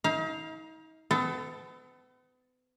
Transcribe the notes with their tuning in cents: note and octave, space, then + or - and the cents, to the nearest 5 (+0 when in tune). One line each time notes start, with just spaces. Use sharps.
D#4 +40 F5 +0
B3 +40 A4 +0